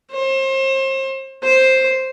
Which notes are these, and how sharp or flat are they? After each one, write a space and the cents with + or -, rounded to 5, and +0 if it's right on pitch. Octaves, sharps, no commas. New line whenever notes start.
C5 +35
C5 +5